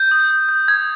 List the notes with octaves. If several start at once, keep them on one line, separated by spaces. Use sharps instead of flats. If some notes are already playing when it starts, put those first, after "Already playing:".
Already playing: G6
D#6
G6
G6
D#6 G#6